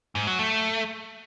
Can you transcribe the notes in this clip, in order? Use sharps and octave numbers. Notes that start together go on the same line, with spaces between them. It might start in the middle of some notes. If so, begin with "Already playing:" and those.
G#2
F#3
A3